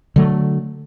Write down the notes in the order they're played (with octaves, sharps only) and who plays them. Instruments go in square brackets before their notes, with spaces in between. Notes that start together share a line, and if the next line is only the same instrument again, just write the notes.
[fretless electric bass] D3 F#3 A3